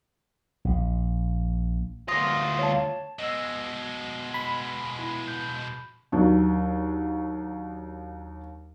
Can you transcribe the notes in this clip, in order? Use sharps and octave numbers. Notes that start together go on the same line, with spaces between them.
A#1
D2 F4 D#6 A#6
C#5 A5
B2 G#3 D#5 E6
B5
E4
G6
D#2 F#3 D4